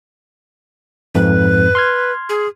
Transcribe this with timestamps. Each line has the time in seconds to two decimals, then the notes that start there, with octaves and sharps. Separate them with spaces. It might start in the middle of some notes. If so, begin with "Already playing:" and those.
1.15 F2 G#2 B4
1.75 C6 F6 G#6
2.29 G#4